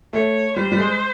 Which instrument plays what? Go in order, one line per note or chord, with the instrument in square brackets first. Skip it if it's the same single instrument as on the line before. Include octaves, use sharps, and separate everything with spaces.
[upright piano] A3 [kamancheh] C#5
[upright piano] G3 [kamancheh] C5
[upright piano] G3
G#3